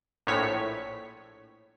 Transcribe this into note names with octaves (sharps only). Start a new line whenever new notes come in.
A#1 A2 C#5 B6